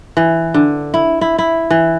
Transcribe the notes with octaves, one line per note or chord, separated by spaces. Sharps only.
E3
D3
E4
E4
E4
E3